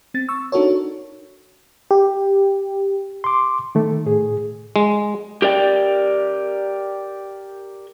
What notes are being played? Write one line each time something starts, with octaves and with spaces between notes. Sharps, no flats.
C4 A6
C#6 E6
D4 D#4 F#4 A4 A#4 C#5
G4
C6 D6
D#3 A3
A2 G#4
G#3
G4 A#4 D5 G5